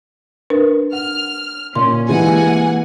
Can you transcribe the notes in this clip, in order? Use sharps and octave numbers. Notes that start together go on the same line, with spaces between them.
D4 A#4 B4
F#5 F6
A#2 C#4 C6
C3 E3 G#3 A#3 F#5 G#5